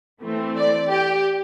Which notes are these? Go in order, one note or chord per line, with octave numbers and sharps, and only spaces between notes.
E3 A3 C4
D5
G4